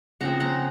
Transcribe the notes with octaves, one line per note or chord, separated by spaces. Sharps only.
C#3 F3 C4 F#5 A#5
F#5 A#5